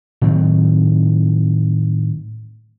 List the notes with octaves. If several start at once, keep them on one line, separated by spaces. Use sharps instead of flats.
A2 D#3 F#3 C4